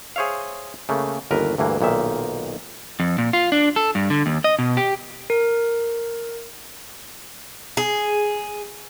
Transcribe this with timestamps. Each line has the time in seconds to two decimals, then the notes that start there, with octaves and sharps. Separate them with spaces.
0.16 G#4 C5 C#5 E5 F5
0.89 C#3 A3 A#3
1.31 G1 D#2 A#4 B4
1.58 D2 G2 E3 A#3
1.81 B1 A#2 D#3 E5
3.00 F2
3.18 A#2
3.33 F4
3.52 D4
3.76 A4
3.95 G2
4.10 D3
4.26 D#2
4.44 D#5
4.59 B2
4.77 G4
5.30 A#4
7.77 G#4